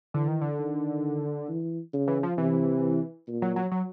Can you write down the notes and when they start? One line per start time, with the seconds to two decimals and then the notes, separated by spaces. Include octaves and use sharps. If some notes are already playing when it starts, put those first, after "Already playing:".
0.14 D3 E3
0.28 D#3
0.41 D3
0.59 D#3
1.49 E3
1.93 C#3
2.08 E3
2.23 F3
2.38 C3 E3
3.27 A#2
3.42 F#3
3.56 F#3
3.71 F#3